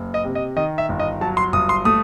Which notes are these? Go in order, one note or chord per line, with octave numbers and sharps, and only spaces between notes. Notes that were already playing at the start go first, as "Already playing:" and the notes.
Already playing: F#1
D#5
C3
D#5
D#3 D#5
E5
G1
D#5
F#3 A5
C6
G1 D#6
C6
A3 D#6